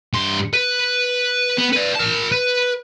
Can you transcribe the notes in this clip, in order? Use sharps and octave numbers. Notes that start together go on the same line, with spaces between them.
G2 C6
B4
B3
B4 D5
A#4 A5
B4